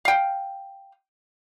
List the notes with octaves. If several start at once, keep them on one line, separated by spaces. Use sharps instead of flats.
F5 G5